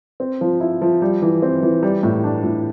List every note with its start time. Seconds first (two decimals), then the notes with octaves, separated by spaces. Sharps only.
0.20 C4
0.41 F3
0.60 E4
0.82 F3
1.02 G3
1.22 E3
1.42 C4
1.62 E3
1.83 G3
2.03 A2
2.24 D4
2.44 A2